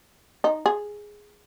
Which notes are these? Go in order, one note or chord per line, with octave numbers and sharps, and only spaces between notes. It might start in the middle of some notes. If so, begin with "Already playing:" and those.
D#4
G#4